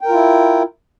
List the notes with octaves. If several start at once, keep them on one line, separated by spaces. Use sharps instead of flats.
E4 F4 A#4 G5